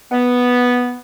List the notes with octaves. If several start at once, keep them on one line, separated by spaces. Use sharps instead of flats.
B3